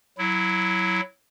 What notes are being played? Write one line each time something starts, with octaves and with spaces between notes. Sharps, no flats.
F#3 E4